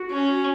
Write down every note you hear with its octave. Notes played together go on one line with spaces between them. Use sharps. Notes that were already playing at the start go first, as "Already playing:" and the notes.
Already playing: F#4
C#4